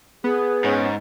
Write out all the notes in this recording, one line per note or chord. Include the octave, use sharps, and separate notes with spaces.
B3 G#4
G#2 C#4